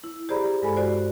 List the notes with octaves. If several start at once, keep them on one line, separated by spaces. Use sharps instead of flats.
E4
G4 G#4 C5 D5 A#5 B5
G2 G#3 A4 G#5 B5
F#4 C5 D5